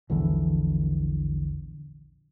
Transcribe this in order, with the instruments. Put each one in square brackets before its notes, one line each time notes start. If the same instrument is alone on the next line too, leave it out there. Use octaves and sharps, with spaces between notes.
[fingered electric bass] A#1 E2 D3 E3